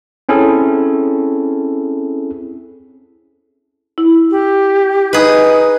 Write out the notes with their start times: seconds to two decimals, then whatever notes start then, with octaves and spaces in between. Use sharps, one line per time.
0.29 C4 C#4 E4 G#4 A4
3.98 E4
4.31 G4
5.13 D#4 G#4 B4